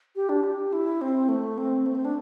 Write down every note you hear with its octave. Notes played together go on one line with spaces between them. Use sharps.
G4
D4
G4
E4
C4
A3
C4
A3
C4
D4